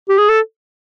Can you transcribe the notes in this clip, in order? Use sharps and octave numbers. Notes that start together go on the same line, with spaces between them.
G4
G#4
A4